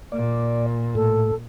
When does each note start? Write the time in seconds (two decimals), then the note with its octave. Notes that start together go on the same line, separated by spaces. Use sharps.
0.12 A#2 D5
0.95 A2 A4